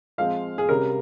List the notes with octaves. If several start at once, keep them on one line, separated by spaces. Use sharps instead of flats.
F3 G#3 C4 F5
G#4
C3 G3 C#4 A#4